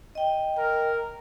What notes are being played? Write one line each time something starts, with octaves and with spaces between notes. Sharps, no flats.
D#5 G5
A#4